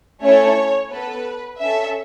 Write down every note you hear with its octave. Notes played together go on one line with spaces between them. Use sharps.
A3 C#4 E4 A4 C#5
B3 A4 B4
C#4 A4 E5